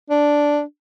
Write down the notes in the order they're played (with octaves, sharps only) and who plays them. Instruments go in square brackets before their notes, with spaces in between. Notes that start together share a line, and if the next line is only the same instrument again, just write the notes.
[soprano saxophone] D4